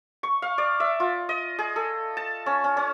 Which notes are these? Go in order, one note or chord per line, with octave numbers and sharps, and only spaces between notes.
C#6
F5
D5
E5
F4
D#5
G#4
A4
A5
C#4
C#4
C#4